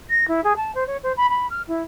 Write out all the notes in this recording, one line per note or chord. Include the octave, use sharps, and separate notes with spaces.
A#6
E4
G#4
A5
C5
C#5
C5
B5
B5
F6
E4